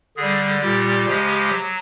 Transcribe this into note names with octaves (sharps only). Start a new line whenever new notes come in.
D3 G3 G#4
A#2 G3 G4
C#3 F3 G#3
F#3